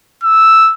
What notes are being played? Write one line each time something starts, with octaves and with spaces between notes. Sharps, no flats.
E6